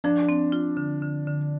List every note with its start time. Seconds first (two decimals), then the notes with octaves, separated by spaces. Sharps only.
0.04 F3 D4
0.29 C4
0.52 F4
0.77 D3
1.02 D3
1.27 D3